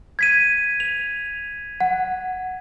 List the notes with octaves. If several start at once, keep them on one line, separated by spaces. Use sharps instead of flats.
G#6 B6 D#7
F7
F#5